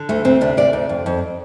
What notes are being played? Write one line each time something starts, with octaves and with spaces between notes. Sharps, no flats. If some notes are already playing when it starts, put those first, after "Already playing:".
Already playing: D3
D2 A3
D2 C4
C3 D4
D2 D5
D2
F2
F2